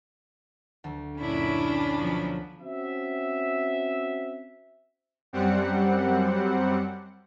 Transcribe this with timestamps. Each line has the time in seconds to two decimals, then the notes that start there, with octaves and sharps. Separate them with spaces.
0.84 D2
1.20 F#2 A#2 C#4 D4 E4 B5
1.96 B2 F3 F#3
2.60 C4 C#4 F#4 E5
5.33 F#2 G3 C4 F#5 C#7